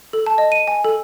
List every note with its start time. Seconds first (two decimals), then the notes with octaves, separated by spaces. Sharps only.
0.13 A4
0.26 A5
0.38 D#5
0.52 D#7
0.68 G#5
0.84 A4